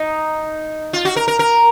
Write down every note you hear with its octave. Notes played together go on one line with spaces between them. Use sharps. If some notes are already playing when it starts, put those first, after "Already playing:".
Already playing: D#4
F4
F#4
A#4
A#4
A#4